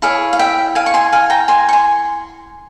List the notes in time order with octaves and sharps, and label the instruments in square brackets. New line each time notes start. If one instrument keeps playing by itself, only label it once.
[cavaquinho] E4 G#4 C#5 F5
F5
E5 G5
F5 G#5
C#6
G#5 C6
F5 G#5
G5 A#5
G#5 C6
C#6
G#5 C6